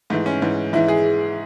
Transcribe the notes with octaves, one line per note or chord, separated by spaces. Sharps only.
G#2 E3 A3
C#4
G#2 E3
G#2 E3 E4
G#4